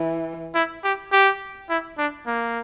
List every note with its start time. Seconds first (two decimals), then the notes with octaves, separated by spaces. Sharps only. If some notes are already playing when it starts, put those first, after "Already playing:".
Already playing: E3
0.55 E4
0.84 G4
1.12 G4
1.69 E4
1.98 D4
2.27 A#3